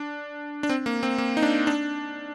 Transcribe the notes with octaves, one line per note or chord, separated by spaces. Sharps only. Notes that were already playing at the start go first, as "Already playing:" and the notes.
Already playing: D4
D4
C4
A#3
C4
A#3
D#4
D4
D4